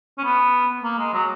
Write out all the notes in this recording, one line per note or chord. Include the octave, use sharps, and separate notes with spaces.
C#4
B3
A#3
G#3
F#3